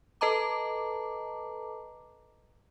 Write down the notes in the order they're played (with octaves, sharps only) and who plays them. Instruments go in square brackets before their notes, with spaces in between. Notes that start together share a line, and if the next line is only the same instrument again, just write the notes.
[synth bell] A4 B4 D#5 A5 A#5 D6